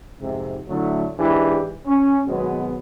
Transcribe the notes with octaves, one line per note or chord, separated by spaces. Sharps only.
F2 G#2 C3
A2 D3 F#3 A3
G#2 E3 D4 G4
C#4
G#1 B2 F#3 G#3 B3